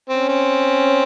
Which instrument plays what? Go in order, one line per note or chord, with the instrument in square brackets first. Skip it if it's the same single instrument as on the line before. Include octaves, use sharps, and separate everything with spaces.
[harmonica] C4
[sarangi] C#4
[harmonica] C4